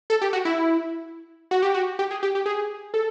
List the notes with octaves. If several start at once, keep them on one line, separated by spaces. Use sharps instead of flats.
A4
G4
F#4
E4
F#4
G4
F#4
G4
G#4
G4
G4
G#4
A4